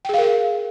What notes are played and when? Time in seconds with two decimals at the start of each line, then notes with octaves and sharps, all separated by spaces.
0.05 G5
0.09 G#4
0.14 F5
0.18 A#4